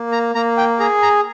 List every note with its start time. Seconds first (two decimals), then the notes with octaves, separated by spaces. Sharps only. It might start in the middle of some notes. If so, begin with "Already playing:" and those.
Already playing: A#3
0.12 A#5
0.35 A#3 A#5
0.57 G5
0.80 G#4 A#5
1.02 A#5